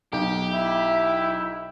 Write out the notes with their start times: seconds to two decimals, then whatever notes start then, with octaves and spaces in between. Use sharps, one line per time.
0.12 B1 G4
0.53 E4 E5